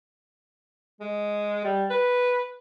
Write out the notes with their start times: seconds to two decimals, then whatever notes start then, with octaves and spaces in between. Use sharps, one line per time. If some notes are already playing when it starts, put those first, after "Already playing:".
1.00 G#3
1.64 G3
1.90 B4